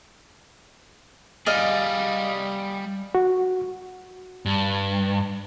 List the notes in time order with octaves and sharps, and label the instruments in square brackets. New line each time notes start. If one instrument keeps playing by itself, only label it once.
[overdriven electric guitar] G3 G#4 [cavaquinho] D5 D#5 F5
[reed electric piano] F#4
[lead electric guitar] G2